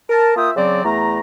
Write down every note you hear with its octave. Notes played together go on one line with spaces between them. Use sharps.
A#4 A5
A#3 F4 E5 G5 D#6
C#3 F#3 C4 D5
E2 A3 A#5